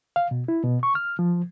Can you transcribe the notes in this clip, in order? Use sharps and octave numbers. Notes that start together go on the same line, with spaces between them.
F5
B2
E4
B2
C#6
F6
F3